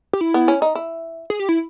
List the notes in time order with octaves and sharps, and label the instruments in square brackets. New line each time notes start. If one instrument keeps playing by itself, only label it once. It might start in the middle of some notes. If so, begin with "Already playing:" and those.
[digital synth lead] G4
E4
[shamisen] B3
C#4
D#4
E4
[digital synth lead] G#4
G4
E4